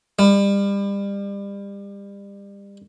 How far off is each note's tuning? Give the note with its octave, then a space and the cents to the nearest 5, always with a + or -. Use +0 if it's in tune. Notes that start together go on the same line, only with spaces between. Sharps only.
G3 +30